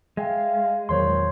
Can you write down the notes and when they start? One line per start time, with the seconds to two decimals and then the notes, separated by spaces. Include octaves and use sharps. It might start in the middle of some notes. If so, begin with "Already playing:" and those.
0.17 G#3 E5 F5 G5 G#5
0.89 E2 A#2 D#3 F#3 C5 C#5 C6